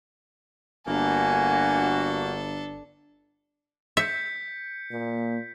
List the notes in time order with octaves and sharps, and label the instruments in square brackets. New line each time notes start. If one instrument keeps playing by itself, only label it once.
[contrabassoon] G1 [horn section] A#3 F#4 [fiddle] D4 A4 [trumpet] G#5
[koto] E5 [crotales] G6 B6 C#7
[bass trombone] A#2 [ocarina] A#3